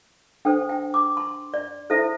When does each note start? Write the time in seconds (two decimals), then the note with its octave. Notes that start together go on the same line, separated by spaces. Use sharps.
0.45 D4 A4 C5 G5
0.69 G5
0.94 D6
1.17 C6
1.54 D5
1.90 E4 A4 C5 E5